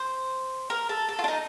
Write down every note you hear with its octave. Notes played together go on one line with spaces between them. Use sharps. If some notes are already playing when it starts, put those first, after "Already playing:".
Already playing: C5
A#4
A4
A4
F4
D4
D#4